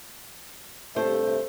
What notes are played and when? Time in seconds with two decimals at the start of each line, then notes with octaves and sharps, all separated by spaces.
0.96 G2 C3 A3 C5